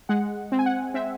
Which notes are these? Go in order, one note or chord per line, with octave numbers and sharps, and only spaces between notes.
G#3 F#5
C4
G#5
F#5
C4 E5